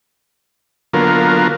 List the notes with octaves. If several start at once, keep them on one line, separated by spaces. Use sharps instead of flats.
D3 F#3 A#3 B3 F4 A#4